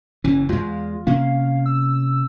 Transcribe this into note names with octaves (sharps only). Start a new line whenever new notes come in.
F#1 E3 C#4
E2 G#3 F4
C3 A#3 C#4 F5
E6